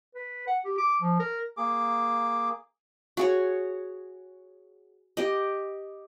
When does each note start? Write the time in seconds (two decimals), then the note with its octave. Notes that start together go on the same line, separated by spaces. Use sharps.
0.15 B4
0.47 F#5
0.65 G4
0.78 D6
1.02 F3
1.20 A#4
1.57 A#3 G#4 D6
3.17 F#4 G#4 C#5
5.17 G4 D#5